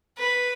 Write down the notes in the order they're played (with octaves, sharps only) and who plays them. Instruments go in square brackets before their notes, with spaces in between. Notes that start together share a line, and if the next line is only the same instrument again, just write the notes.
[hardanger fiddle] B4